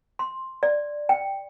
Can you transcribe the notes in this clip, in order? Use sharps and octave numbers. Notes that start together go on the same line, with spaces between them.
C6
D5
G5